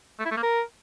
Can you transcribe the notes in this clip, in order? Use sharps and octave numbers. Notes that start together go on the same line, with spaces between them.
A3
E4
A3
A#3
A#4